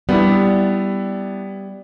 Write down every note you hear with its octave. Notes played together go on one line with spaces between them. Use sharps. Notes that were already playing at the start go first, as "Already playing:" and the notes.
G3 B3 D4 E4